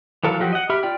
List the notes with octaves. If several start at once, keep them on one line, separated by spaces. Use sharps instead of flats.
E3 F#3 A4 A#4 F5
F3 F#3 F#4 G4
D#5 F#5
G4 E5 B5 F6
F4 D5 G5 F6